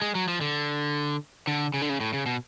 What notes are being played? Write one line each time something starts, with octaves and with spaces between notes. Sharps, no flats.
G#3
F#3
F3
D3
D3
C#3
D3
C#3
A2
C#3
B2